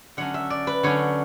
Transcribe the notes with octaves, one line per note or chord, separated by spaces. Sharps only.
D3 F#3 A3 C#4 F#5
E5
D5
B4
D3 F#3 A3 C#4 C#5